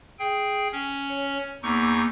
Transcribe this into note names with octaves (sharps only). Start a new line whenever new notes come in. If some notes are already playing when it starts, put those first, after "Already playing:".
G#4 G5
C#4
C#5
E2 A#3 D#4 C#6 D6 E6